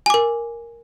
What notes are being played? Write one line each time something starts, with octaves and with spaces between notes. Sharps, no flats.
A#4 G#5 D6